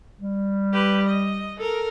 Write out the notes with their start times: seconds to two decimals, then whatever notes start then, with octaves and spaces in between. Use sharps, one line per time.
0.20 G3
0.73 G4 B4
1.06 D#5
1.57 A4 A#4